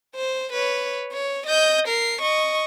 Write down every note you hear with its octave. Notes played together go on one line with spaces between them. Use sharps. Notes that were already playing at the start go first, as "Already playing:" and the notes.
C5
B4 C#5
C#5
D#5 G6
A#4 C7
D#5 C#6